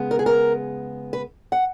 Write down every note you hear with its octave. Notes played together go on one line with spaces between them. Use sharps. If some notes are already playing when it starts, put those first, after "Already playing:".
Already playing: C#3 G#3 B3
A#4
G#4
A#4
B4
F#5